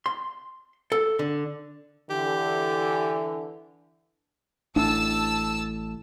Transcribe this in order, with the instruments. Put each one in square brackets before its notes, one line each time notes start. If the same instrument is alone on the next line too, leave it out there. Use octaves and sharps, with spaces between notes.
[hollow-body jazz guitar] C6
A4
D3
[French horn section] D3 E3 [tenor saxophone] G4
[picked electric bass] A1 A2 [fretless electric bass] D4 [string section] A5 E6